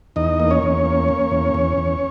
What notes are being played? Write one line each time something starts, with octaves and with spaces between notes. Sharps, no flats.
E2 D#4 D#5
A#3
C#4 C#5
E2
A#3
A#3
E2
E2
E2